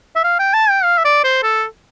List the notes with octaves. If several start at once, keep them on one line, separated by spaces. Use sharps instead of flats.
E5
F5
G5
A5
G5
F5
E5
D5
C5
A4